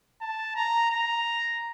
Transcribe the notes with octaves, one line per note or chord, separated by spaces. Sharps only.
A5
A#5
A#5